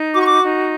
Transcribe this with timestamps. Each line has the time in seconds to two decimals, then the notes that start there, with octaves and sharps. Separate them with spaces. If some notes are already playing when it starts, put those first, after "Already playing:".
Already playing: D#4
0.13 F#4 D6
0.21 C#6
0.27 D6
0.42 D#4